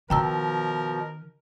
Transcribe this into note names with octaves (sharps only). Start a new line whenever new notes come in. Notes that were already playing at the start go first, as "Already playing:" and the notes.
B2 D#3 F3 A#4 G5 A#5 E6